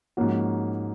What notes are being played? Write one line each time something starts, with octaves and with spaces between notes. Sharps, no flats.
G#2 F3 A#3 C#4 F#4